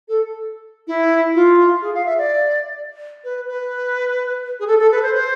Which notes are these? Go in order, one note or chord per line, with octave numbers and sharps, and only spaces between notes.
A4
E4
F4
G#4
F5
E5
D5
B4
B4
G#4
A4
A4
B4
C5
C5